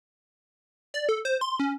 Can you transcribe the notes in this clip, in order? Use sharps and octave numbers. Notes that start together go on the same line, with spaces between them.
D5
A4
C5
C6
C#4